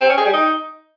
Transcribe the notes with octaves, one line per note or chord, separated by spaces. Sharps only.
C4
C#4
G#4
G3
D#4